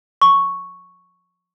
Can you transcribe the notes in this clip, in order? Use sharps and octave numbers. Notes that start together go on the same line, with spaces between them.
C#6